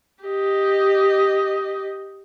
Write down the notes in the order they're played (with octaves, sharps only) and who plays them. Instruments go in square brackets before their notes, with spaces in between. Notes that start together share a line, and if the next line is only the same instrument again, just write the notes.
[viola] G4 D#5